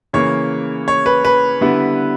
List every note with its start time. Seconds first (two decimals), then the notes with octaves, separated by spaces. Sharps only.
0.13 C#3 E3 A#3 C#5
0.88 C#5
1.06 B4
1.25 B4
1.61 D3 G3 B3 E4